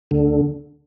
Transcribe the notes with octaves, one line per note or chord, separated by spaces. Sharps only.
D2 D3